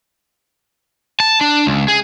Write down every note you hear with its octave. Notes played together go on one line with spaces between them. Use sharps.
A5
D4
C#2
G#4